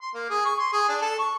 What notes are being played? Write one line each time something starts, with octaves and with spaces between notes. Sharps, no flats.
C6
A#3
G#4
C#6
C6
G#4
D4
A4
C#6